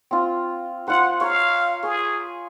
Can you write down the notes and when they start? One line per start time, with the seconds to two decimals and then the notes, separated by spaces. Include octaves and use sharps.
0.11 C4 F4
0.87 F4 C5 F#5
1.21 C#5 F5 A#5
1.83 G#4 C#6